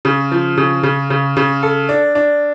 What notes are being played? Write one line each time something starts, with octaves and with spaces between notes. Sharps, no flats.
C#3
F3
C#3
C#3
C#3
C#3
A4
D4
D4